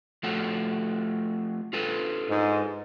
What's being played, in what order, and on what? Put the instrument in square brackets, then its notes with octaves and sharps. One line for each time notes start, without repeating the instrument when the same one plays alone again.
[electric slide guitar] F3 A3 F#4
F4 A4 B4
[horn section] G#2